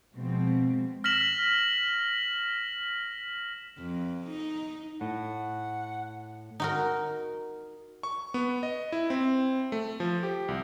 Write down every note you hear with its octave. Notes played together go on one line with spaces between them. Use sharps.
B2 F3 G#3 C4
F6 A#6 B6 E7 F#7
F2
D#4
A2 F#5
D#4 F#4 A#4
C#6
B3
D#5
E4
C4
A3
F3
G4
C2